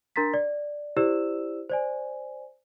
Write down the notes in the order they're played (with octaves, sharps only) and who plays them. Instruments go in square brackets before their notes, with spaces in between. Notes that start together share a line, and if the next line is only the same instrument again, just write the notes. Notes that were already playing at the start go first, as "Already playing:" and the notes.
[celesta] D4 A#4 A#5 C6 A6 B6
D5
E4 G4 C5 D5 E6 E7
C5 D5 G#5